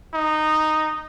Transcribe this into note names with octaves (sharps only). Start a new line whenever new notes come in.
D#4